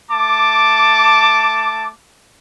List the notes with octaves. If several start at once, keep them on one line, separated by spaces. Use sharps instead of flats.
A3 A5 D6